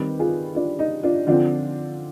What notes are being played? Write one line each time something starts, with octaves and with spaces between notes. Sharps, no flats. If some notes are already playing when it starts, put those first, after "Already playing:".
Already playing: D#3 G3 C4 G4 B4
F4 G#4
D4 F4
D#4
D4 F4
D3 F3 C4 D4 F4